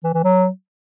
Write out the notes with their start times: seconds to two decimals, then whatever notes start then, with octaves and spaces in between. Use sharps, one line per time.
0.04 E3
0.14 E3
0.24 F#3